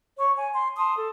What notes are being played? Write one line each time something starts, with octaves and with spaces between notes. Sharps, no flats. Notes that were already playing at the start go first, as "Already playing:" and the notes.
C#5 C#6
G#5
C6
A5 C6 D#6
A4